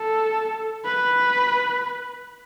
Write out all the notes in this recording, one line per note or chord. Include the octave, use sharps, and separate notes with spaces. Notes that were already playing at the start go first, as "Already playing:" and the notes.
Already playing: A4
B4